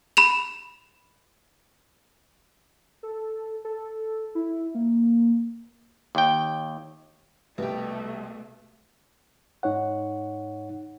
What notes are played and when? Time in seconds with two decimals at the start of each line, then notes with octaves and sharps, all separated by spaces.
0.17 B5 E7 F7
3.03 A4
3.65 A4
4.35 E4
4.75 A#3
6.15 D#2 G5
7.58 C2 B2 G3 A3 G4
9.63 G#2 D#4 C#5 F#5